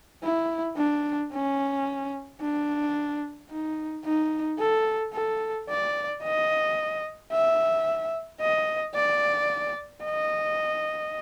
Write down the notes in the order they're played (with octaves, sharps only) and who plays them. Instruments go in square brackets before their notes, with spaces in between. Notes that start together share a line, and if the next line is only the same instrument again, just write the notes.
[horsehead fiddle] E4
D4
C#4
D4
D#4
D#4
A4
A4
D5
D#5
E5
D#5
D5
D#5